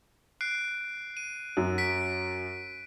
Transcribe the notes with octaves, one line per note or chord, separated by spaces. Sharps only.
F#6 C7 D7
D#7
F#2
B6 D7